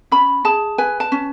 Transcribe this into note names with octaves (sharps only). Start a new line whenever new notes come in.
C#4 B5
G#4 A5
B4 G#5
A5
C#4